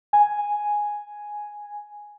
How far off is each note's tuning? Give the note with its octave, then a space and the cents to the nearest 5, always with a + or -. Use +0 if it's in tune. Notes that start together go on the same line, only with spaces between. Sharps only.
G#5 +0